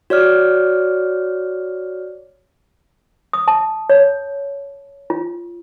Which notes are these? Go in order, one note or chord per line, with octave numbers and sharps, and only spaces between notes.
F#4 C#5 D5 F6
D#6
A5
C#5
F4